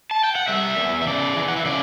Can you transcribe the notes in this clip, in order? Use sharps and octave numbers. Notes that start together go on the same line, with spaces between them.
A5
G5
F#5
G3 E5
E2
E5
C#3 D5
E3
F#5
E5
C#3 D5